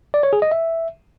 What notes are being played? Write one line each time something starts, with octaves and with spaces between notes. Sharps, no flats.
D5
C#5
G#4
D#5
E5